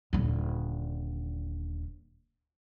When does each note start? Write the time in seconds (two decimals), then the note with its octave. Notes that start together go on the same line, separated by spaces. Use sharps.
0.13 D#1 D3